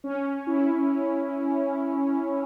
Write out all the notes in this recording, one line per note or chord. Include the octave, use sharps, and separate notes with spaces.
C#4
E4